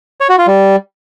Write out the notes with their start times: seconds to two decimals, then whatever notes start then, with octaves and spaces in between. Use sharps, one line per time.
0.20 C#5
0.29 F#4
0.38 F4
0.47 G3